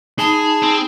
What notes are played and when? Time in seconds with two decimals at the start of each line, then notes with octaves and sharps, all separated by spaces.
0.19 D#4 G#4 A5 B5 D#6
0.62 C4